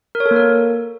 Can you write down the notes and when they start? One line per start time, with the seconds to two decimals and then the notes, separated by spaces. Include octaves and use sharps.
0.15 A#4
0.20 C#5
0.26 A4
0.31 A#3
0.36 A#4